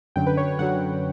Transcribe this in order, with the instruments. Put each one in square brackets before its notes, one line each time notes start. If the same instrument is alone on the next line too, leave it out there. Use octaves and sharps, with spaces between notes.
[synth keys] F#2 D3 F#3 G5
B4
C#5
C#5
F#2 D3 F#3 F#5